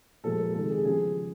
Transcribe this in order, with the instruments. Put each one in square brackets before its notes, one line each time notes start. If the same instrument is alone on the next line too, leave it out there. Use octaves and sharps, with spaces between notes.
[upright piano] A#2 F3 G#3 A4
A#4
C3 D#3 G#3 A4
G#4
C#3 F3 G#4